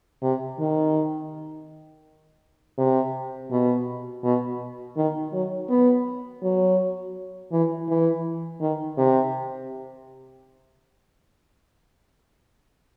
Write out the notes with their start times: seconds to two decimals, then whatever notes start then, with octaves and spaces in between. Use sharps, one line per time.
0.23 C3
0.59 D#3
2.78 C3
3.51 B2
4.24 B2
4.97 D#3
5.33 F#3
5.69 B3
6.43 F#3
7.52 E3
7.88 E3
8.61 D#3
8.97 C3